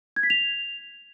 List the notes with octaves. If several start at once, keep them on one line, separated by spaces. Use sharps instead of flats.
G#6
B6
F7